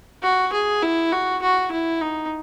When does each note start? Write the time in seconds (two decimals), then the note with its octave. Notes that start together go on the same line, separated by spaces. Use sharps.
0.22 F#4
0.52 G#4
0.82 E4
1.12 F#4
1.42 F#4
1.71 E4
2.01 D#4